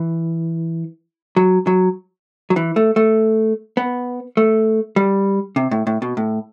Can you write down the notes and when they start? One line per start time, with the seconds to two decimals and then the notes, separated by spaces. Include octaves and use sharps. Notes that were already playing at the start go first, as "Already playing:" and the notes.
Already playing: E3
1.36 F#3
1.67 F#3
2.50 F#3
2.56 E3
2.76 A3
2.96 A3
3.77 B3
4.37 A3
4.96 G3
5.56 C3
5.71 A2
5.87 A2
6.02 B2
6.17 A2